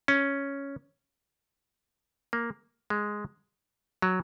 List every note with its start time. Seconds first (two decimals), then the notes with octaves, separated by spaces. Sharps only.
0.08 C#4
2.33 A#3
2.90 G#3
4.02 F#3